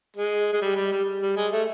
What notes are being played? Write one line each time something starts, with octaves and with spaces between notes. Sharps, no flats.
G#3
G#3
G3
G3
G3
G3
G#3
A3